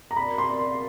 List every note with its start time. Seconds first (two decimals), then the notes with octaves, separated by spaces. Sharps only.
0.11 A#5
0.16 F#4 A#4 D5 F5 B5
0.38 C6